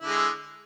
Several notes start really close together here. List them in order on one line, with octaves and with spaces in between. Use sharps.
E4 D3 G#3